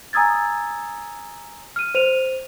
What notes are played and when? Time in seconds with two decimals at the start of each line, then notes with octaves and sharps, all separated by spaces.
0.13 G#5 A#5 D#6 E6 G#6 A6
1.76 F6 D#7
1.95 C5 D#7 F7